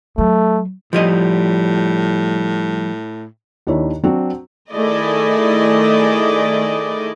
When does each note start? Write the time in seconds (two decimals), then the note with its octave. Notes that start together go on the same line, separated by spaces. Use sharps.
0.18 F#3 A3
0.93 A2 F3 G3 D#5
3.67 D#2 D#3 D4 E4 C#5
4.03 F#3 C4 D4 F#4
4.72 D#3 A3 E4 G#4 D5 D#5